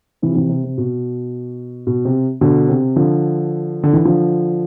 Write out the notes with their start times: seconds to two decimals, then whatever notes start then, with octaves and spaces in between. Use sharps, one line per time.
0.22 C3 E3
0.32 F3
0.35 C3 E3
0.49 C3
0.64 C3
0.78 B2
1.87 B2
2.05 C3
2.41 B2 D3
2.69 C3
2.96 D3 F3
3.83 D3
3.93 E3
4.05 D3 F3